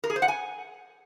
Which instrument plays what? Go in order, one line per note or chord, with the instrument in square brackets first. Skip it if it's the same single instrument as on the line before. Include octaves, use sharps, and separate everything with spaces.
[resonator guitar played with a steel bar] A#4
G#4
C5
F#5
G#5